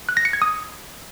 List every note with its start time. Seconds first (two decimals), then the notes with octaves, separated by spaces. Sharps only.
0.09 F#6
0.17 A#6
0.25 C#7
0.33 G#6
0.42 D#6